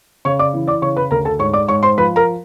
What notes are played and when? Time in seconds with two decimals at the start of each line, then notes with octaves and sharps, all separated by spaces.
0.25 C#3 C#5 C#6
0.39 D5 D6
0.54 E3
0.67 D5 D6
0.82 C#3 C#5 C#6
0.96 B4 B5
1.11 D2 A#4 A#5
1.25 A4 A5
1.39 G#2 C#5 C#6
1.54 D5 D6
1.68 G#2 C#5 C#6
1.83 C5 C6
1.98 F3 B4 B5
2.16 A#4 A#5